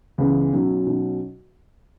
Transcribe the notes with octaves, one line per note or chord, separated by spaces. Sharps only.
C#2 C#3 E3 G#3 B3
B1 B2 F#3 C#4
B1 B2 F#3 C#4